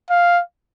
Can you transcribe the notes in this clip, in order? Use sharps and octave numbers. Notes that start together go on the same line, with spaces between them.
F5